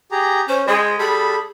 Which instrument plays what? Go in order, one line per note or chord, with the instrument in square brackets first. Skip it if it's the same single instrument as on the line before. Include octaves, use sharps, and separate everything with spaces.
[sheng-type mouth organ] G4 G#4 A#5
[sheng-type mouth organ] C#4 [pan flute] C5
[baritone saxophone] G#3 [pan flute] G#4 [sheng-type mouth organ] C5
[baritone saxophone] G3 [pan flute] G#4 [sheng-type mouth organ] A4 B5